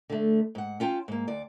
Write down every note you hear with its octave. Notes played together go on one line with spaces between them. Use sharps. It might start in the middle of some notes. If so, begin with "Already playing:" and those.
D3 A3
G#2 F#5
C#4 F4 G5 A5
G#2 A#3
D2 D5